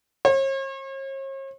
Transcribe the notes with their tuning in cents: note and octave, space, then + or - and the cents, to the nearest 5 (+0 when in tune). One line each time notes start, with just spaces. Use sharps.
C#5 -45